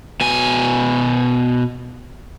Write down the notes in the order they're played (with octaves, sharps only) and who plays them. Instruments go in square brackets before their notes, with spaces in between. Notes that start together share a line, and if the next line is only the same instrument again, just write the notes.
[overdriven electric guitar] B2 G#5